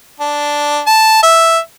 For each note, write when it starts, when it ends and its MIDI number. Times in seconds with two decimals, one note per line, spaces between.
0.20 0.81 62
0.86 1.20 81
1.23 1.58 76